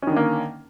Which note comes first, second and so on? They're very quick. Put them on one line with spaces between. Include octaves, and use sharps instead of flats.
C#4 D#3 D3 A#3